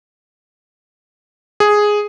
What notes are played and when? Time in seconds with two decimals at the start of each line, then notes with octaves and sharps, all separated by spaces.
1.60 G#4